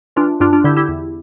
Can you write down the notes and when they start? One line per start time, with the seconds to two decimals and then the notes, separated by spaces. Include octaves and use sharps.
0.16 E3 D4 F4
0.40 G2 D4 F4
0.53 D4 F4
0.64 D3 E4 G4
0.77 E4 G4
0.89 E2